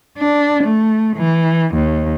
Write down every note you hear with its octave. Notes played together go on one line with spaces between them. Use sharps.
D4
A3
E3
D#2